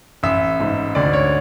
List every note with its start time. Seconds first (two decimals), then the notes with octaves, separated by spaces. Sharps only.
0.23 A1 E5
0.60 G#2
0.95 D2 D5
1.13 C#5